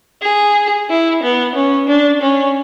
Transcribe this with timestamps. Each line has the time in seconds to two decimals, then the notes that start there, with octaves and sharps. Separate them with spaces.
0.23 G#4
0.90 E4
1.23 B3
1.56 C#4
1.88 D4
2.22 C#4